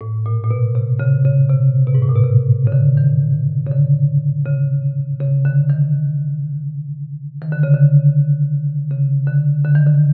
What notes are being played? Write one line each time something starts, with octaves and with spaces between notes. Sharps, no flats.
A2
A#2
A#2
B2
C3
C#3
C#3
C3
B2
G#2
A2
A#2
B2
C3
C#3
D3
D#3
C#3
D3
C#3
C#3
D3
D#3
D#3
D3
C#3
D3
C#3
D3
D3
D#3
D3